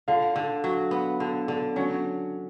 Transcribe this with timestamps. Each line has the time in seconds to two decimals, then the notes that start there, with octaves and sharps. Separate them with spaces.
0.08 D3 F4 F5
0.36 D3
0.64 F#3
0.91 B3
1.20 D3
1.48 D3
1.76 F#3 C#4 C#5